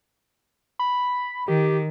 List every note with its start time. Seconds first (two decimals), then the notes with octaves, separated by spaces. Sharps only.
0.79 B5
1.48 D#3 G4